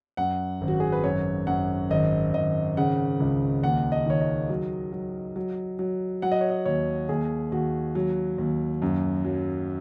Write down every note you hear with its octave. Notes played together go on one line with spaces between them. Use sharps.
F#2 F#5
G#1
F#4
G#4
B4
F#2 C#5
F#2 F#5
G#1 D#5
G#1 D#5
C#3 F#5
C#2
D#2 F#5
D#5
D#3 C#5
D#5
F#3
F#3
F#3
F#3
F#3 F#5
D#5
C#5
D#5
D#2 C#5
D#2 G#4
D#2 F#4
F#3
D#2
F#2
F#3